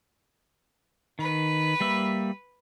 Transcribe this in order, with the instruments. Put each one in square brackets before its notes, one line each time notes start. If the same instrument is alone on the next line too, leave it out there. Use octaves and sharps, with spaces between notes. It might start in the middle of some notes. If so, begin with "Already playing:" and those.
[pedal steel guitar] D#3 [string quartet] B4
[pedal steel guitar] G3 A#3 E5